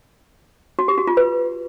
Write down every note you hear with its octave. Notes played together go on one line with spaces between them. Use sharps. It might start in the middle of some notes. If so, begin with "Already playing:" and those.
F#4
G4
F#4
F4
B4